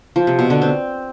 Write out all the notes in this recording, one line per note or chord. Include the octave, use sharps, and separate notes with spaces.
F3
C3
B2
D3
C4